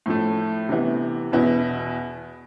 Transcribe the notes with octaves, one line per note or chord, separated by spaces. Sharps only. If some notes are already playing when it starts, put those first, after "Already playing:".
A2 F3 A3
C3 E3 B3
E2 B2 B3 E4